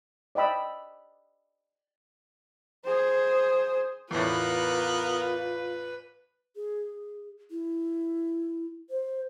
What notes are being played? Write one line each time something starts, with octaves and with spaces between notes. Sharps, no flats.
D5 D#5 G5 B5 E6
G#4 C5
E2 A2 B3 F4 A#4 B4
G#4
E4
C5